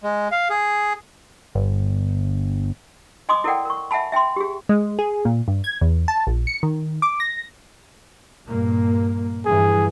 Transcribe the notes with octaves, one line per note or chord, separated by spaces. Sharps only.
G#3
F5
G#4
G1
D#5 G#5 C6 D6 D#6
E4 A4 A#4 D5 F#5 G5
A#4 C#6
E5 F#5 G#5 A5 B5
E5 G5 G#5 C6
G4 G#4
G#3
G#4
A#2
G2
G#6
E2
A5
A#1
C#7
D#3
D6
A#6
G2 A#2 A#3
G2 E3 G#4